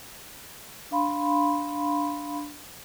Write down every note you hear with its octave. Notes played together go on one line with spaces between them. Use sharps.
D4 F5 B5 C6